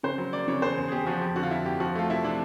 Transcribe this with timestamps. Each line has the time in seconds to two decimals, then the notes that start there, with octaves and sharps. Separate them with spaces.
0.03 C#3 C5
0.18 F#3
0.33 A#3 D5
0.48 C#3 C#5
0.62 E2 C5
0.78 E2
0.88 G#4
0.92 E2 G4
1.06 F3 F#4
1.21 F2 G4
1.35 D3 F#4
1.43 F4
1.51 F2 E4
1.65 F2 G4
1.80 F3 F#4
1.95 A3 F4
2.09 C3 E4
2.24 C3 D4